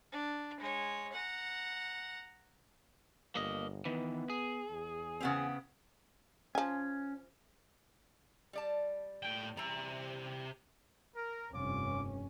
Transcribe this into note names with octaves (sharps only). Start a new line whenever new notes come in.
D4
G#3 C#5
F#5 A#5
G1 A#3 D#5
D#3 E3 B3
G#4
E2
C#3 B3 C4
F3 C#4 G#5
G3 D5 A5
A2 G5
C3 E3 G3 A#5
A#4
F1 G2 C#4 F4 D6